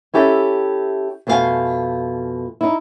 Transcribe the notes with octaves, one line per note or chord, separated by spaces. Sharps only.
C#4 E4 G4 A4 E5
F2 B2 A3 B3 F5 G#5
D#4 E4